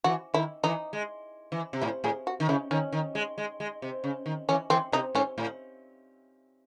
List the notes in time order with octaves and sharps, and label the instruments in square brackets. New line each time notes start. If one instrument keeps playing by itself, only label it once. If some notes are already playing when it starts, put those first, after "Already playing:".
[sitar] E3 [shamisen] F#4
[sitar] D#3 [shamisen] E4
[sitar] E3 [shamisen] D#4
[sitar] G#3
E3
C3
[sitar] A2 [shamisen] E4
[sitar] A2 [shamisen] G#4
[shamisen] F#4
[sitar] D#3
[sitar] C#3 [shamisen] E4
[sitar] D#3 [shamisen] C#4
[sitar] D#3
G#3
G#3
G#3
C3
C#3
D#3
[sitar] E3 [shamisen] C#4
[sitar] E3 [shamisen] C4
[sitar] C3 [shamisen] D#4
[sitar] G#2 [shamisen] C#4
[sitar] A2